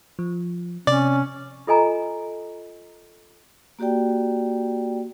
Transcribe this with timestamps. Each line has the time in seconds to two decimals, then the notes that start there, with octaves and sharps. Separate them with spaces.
0.19 F3
0.87 C3 C#4 D5
1.67 F4 A4 D#5 G#5 A#5
3.79 A#3 F#4 G4 D5 G5